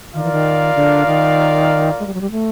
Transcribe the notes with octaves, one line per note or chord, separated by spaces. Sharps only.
D#3 F4 A#4 D5 F5
E3
D#3
D3
D#3
G#3
G3
F#3
G3
A3